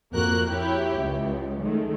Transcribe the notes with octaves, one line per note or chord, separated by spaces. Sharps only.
F2 A#3 F#4 A#4 F#6
E4 G4 C#5
C#2
D#3 G#3 A3